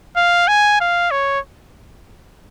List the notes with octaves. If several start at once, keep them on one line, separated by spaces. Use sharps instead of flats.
F5
G#5
F5
C#5